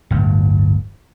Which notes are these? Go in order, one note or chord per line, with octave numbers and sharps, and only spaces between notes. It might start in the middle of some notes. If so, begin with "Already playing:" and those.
D1 G1 G2